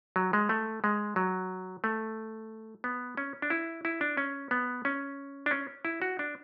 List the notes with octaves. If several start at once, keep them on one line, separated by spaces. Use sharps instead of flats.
F#3
G#3
A3
G#3
F#3
A3
B3
C#4
D4
E4
E4
D4
C#4
B3
C#4
D4
C#4
E4
F#4
D4